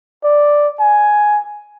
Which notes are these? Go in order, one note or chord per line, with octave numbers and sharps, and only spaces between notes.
D5
G#5